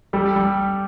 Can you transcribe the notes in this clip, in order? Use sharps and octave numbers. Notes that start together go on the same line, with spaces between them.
G3 G4 A4
G3